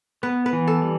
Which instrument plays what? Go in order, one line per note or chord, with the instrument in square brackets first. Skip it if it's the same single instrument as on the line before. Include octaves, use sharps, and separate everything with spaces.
[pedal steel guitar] B3 [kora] B4
[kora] B4
[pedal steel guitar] E3
[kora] A4
[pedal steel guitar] G3